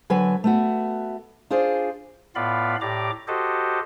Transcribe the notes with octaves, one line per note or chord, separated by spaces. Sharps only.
D3 F#3 B4 G#5
A3 B3 F#4
D4 F4 G#4 C5 D5
A2 B3 F4 D5 F5 B5
A2 G4 D5 A#5 D6
F#4 G4 A4 C5 D#5